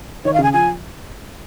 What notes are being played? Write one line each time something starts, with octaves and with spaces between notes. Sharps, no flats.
D#3 C#5
F5
C#3 G#5
F3 G#5